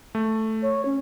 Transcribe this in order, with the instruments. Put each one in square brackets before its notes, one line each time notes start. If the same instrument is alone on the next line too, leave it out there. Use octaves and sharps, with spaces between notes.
[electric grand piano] A3
[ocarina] C#5
C#4